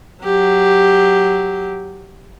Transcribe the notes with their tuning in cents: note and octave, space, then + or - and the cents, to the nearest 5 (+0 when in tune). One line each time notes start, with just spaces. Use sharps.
F#3 +0 G4 +0